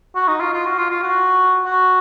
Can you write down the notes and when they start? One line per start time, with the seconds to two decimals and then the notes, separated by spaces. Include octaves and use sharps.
0.15 F#4
0.28 D#4
0.40 F4
0.54 F4
0.66 F#4
0.78 F4
0.90 F4
1.03 F#4
1.65 F#4